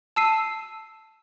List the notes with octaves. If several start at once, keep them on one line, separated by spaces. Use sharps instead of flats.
A5 E6 C7 D#7